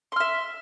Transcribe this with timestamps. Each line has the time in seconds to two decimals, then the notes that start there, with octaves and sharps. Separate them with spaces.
0.12 C6
0.16 F6
0.20 E5